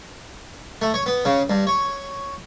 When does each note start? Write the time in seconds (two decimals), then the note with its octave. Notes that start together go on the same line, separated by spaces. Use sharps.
0.82 A3
0.94 C#5
1.06 B3
1.25 C#3
1.50 G2
1.67 C#5